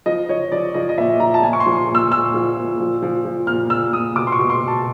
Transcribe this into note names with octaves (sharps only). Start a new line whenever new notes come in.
F3 D#5
F3 C#5
F3 D5
F3 D#5
D#5
A#2 E5
F3 A#5
A5
A#2 G#5
C#6
C6
F3
C6
A#2
E6
A#2 E6
F3
A#2
F3
F3
F3
A#2 F6
A#2 E6
A#2 D#6
B2 D6
C6
C#6
B2
C6
B2
A5